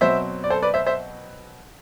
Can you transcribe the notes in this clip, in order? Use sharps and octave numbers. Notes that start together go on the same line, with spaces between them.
B2 F#3 C4 C5 E5
D5
A4 C5
B4 D5
C5 E5
C5 E5